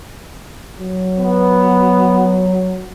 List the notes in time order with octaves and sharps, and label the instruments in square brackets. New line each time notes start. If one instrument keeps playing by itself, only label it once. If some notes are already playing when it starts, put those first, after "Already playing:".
[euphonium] F#3
[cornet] B3